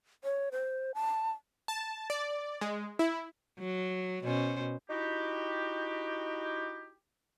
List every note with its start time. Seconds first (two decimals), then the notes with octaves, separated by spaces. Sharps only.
0.24 C#5
0.52 C5
0.95 A5
1.68 A5
2.10 D5
2.61 G#3
2.99 E4
3.59 F#3
4.24 B2 C#4 C5
4.90 D#4 E4 F#4 G4